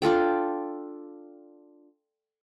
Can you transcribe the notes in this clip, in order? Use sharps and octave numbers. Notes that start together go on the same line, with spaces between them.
D4 F4 A4 G5